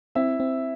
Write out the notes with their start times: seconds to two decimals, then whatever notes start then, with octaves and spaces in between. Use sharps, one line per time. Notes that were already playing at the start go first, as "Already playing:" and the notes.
0.15 C4 E4 E5
0.40 C4